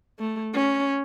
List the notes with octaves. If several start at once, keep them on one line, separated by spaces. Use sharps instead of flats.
A3
C#4